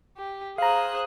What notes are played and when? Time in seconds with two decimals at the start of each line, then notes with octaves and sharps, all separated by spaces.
0.17 G4
0.58 G#4 C5 F5 A#5 F#6